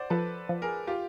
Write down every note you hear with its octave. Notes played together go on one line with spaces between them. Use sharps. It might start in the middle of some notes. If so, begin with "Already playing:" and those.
Already playing: C5 D5 F#5
F3 A4 B4
F3
G#4 A#4
F4 G4